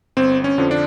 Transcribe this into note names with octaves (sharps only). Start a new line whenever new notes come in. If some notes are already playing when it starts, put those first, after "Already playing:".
G1 C4
C#4
F2 D3 F3
D4